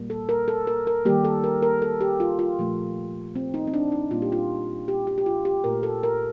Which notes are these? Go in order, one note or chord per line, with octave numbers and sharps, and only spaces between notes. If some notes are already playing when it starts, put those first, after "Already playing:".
Already playing: A#2 G3 A#3
A4
A#4
A4
A#4
A#4
D#3 G3 A#3 G4
A4
A#4
A#4
A4
G4
F4
F4
A#2 F3 A3
C4
D#4
C4
D4
D#4
A#2 G3 A#3 F4
G4
F4
G4
G4
G4
F4
G4
A#2 A3 A#4
A4
A#4